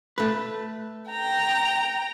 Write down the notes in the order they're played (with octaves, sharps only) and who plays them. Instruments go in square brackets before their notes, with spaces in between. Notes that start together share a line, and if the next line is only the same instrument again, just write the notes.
[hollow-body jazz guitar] A3 B4
[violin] G5 A#5